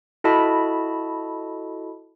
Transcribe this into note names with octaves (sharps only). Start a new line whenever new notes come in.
E4 F#4 A4 D#5 A5 B5